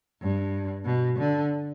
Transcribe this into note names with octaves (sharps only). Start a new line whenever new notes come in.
G2
B2
D3